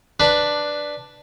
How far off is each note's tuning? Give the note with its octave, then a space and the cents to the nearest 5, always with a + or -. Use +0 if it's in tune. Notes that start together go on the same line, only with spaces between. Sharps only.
D4 +5 B4 +0